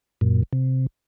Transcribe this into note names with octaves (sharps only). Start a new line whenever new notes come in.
F#2 A#2
C3